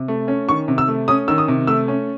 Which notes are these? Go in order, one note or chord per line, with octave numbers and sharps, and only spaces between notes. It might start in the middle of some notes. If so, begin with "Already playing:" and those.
Already playing: C3
A3
C#4
D#3 C#6
C3
E6
A3
C#4 D#6
D#3 E6
D#6
C3
A3 E6
C#4